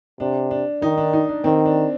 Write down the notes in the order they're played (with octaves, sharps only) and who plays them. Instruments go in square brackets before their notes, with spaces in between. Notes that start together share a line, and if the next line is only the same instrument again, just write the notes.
[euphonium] C3 [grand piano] D4
[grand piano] D4
[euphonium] D#3 [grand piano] D#4
[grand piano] D4
D#4
D4
[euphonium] D#3 [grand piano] C4
[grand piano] D4